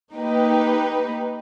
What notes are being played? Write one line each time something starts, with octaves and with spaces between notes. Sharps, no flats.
A#3 D#4 G4 B4